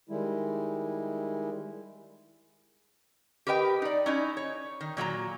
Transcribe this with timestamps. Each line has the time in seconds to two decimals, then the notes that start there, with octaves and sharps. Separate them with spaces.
0.09 D#3 G3 G#3 E4
3.47 G4 A#4 B4 D#5 G5
3.82 D#4 D5
4.06 C#4 D#4 E4
4.37 C#5
4.81 D#3
4.97 A#2 F#3 F#4 A#5